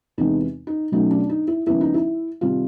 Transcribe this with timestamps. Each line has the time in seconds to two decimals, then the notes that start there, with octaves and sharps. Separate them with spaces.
0.17 E2 C3 E3 G#3 B3 D#4
0.67 D#4
0.92 B2 F#3 A3 C#4 D#4
1.11 D4
1.29 D#4
1.48 E4
1.67 D#2 C#3 F3 G#3 B3 E4
1.81 D#4
1.94 E4
2.41 C3 D#3 G3 F4